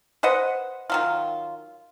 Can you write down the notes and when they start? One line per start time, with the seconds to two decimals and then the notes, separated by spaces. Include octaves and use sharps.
0.23 B4 C5 D#5 F#5
0.90 D#3 F#3 F4